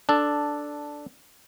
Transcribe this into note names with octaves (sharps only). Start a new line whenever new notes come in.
D4 A4